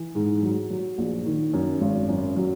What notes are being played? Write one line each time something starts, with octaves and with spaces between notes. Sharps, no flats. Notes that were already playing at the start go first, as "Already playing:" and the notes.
Already playing: E3
G#2
F#3
F#3
A#1
D#3
F#2
G#1
F#2
F#3